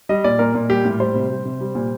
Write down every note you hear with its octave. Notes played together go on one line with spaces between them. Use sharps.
G3 D#5
A#2 D5
A#2 A#4
A#2
G3 G4
A2
G3 C5
C3
G3
C3
G3
A#2